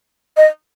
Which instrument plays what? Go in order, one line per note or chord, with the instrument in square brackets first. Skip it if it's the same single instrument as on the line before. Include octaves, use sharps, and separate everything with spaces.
[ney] D#5